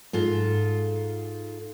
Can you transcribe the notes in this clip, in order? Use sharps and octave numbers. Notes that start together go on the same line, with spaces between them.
G#2 F4 A4